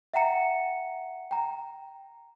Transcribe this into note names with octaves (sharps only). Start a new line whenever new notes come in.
E5 F#5 G5 A#5 C#7
G5 A#5